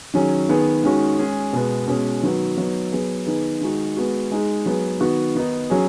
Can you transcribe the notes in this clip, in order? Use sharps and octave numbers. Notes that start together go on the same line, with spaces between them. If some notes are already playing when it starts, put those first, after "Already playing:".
D#3 F#3 C#4 G#4
D#3 B3 G#4
D#3 G#3 C#4 F#4
G#3 C#4 G#4
B2 G#3 B3
B2 G#3 C#4 G#4
D#3 F#3 B3 F#4
F#3 B3 D#4
F#3 B3 G#4
D#3 B3 D#4 G#4
D#3 G#3 D#4 F#4
G#3 B3 F#4
G#3 D#4 G#4
F#3 B3 G#4
D#3 B3 F#4
D#3 B3 D#4
F#3 C#4 G#4